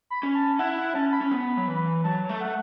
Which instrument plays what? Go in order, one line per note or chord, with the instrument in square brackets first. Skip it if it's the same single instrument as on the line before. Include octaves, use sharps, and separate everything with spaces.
[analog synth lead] B5
[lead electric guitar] C#4
[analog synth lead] A5
[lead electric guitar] E4 [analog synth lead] F#5
[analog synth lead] F#5
[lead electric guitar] C#4 [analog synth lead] A5
[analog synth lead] A5
B5
[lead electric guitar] C#4
B3
F#3
E3
[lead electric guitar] F#3 [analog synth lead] A5
[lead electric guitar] A3
[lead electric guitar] A3 [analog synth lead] F#5